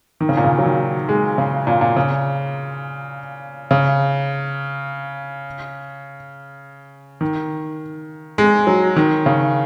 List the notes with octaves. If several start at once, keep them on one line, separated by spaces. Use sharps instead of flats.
D#3
C#3
A#2
C#3
F#3
D#3
G#3
C#3
A#2
A#2
C#3
C#3
D#3
G#3
F#3
D#3
C#3